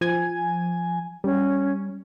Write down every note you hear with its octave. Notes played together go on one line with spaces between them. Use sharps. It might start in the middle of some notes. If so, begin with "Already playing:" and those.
F3 G#5 G#6
G3 C#4